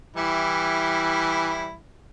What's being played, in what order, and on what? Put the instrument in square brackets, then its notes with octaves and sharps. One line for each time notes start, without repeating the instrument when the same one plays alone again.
[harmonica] E3 G3 E4